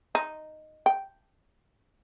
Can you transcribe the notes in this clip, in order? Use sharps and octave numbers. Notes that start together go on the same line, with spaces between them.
D#4
G5